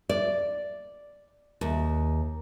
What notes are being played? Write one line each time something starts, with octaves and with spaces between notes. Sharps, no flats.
D5
D#2